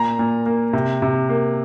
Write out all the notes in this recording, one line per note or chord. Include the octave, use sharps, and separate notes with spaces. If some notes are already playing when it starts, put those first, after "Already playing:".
Already playing: A#2 A#5
A#2
A#3
C3
C3
A#3